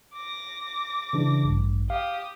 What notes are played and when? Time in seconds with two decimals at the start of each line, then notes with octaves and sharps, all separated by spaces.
0.14 D6 A#6
1.13 C#3 E3 D4
1.44 A1 G2
1.90 G4 F5 D#6